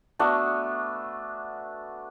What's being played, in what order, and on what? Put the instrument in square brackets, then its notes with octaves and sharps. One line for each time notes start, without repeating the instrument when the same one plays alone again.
[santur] A3 B3 D4 F#4